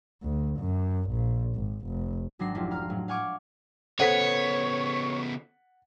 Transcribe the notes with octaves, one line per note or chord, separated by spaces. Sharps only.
D2
F#2
A#1
G#1
F1
G#1 F#3 D4 A#6 C7
F1 F#3 E4 F4
F5 A#5 F6
A2 F#3
F5 F#5 G#5 C#6 D6 F6
C#3 B3 A4 C5 C#5 F#5 B6 D#7